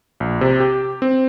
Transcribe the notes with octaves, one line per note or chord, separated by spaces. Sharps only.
A#1
C3
G4
C4